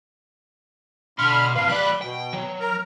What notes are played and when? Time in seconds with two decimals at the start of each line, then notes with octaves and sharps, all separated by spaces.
1.19 B2 D3 B5 C6 F6
1.56 C3 B4 F5
1.68 F#3 D5 B5 F#6
2.02 B2 G5
2.34 F#3
2.60 A#4 A#5